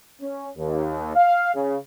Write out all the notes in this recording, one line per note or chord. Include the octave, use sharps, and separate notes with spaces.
C#4
D#2
F5
C#3